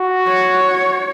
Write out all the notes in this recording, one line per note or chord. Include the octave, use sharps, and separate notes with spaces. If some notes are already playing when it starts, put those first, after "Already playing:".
Already playing: F#4
C#5